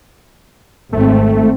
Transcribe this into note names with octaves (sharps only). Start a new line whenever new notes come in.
G#1 A3 C4